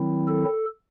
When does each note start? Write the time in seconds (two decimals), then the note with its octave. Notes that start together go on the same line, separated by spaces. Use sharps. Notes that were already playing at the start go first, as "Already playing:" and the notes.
Already playing: D#3 F#3 C4 E4
0.28 A4